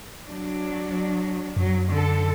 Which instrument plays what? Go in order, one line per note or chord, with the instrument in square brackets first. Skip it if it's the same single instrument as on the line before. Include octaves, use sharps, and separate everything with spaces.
[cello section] F#3 D4
[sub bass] F#2 [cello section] F#3
[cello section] D3 A4